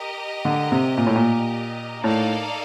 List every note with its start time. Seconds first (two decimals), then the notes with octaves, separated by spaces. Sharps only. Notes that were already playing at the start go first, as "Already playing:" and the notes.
Already playing: G4 A#4 D#5
0.45 D3
0.72 C3
0.98 A#2
1.07 A2
1.16 A#2
2.03 A2 A#3 D#4 A4 D5 F5